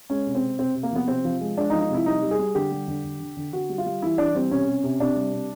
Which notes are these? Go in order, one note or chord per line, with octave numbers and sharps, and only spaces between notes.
G#3 C#4
C3
C4
C3
C3 C4
C3
A#3
F3 B3
C3 C4
F3
G#3
G#3 D4
D#4
F3
D#4
C3 E4
G3 D#4
G3
G#4
G3
D3 G4
G3
D3
D3
D3
D3
D3 F#4
G3
F4
G3
E3 E4
E3 D4
G3 C4
C3 C#4
C3
C3
C3 D4
G3
C3